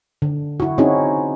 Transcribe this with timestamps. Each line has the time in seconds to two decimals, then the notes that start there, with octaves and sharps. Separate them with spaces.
0.22 D3
0.60 E4 F#4
0.78 C4 C#4 D#4 E4 F#4 G#4